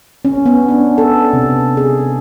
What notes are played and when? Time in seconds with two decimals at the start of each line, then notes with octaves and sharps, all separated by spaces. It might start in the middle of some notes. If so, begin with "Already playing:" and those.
0.25 C#4
0.46 B3
0.69 D4
0.98 A4
1.33 C3
1.77 G#4